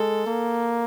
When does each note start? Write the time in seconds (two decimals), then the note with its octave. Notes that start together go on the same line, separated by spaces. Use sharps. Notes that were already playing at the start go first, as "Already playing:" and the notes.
Already playing: G#3 A4
0.27 A#3